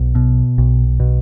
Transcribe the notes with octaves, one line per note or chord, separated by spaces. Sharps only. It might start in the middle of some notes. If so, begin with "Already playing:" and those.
Already playing: B1
B2
B1
B2